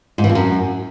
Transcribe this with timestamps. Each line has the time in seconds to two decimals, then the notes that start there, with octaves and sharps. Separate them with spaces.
0.18 G#2
0.24 E3
0.29 F2
0.35 F#2